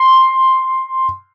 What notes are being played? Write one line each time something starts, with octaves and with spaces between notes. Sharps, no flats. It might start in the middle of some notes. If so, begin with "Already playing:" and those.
Already playing: C6